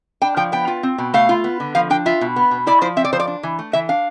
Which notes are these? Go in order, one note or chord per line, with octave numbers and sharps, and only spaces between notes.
D4 G5
F3 G5
B3 G5
F4
C4
B2
A3 F5
F4
B3
D3
F3 F5
D4 G5
F4 E5
B2
B3
B2
E4 D5
F3 C5
C4 E5
D5
F3 C5
D5
D4
E3
A3
E3 E5
D4 F5